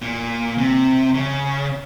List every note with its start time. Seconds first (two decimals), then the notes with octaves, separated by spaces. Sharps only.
0.02 A#2
0.58 C3
1.15 C#3